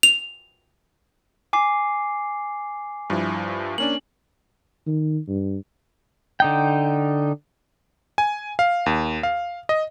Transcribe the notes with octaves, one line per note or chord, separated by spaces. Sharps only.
F7
G#5 D6 C7
G2 F3 E4
A#3 C#4 D4 F#7
D#3
G2
D3 D#4 G5
G#5
F5
D#2
F5
D#5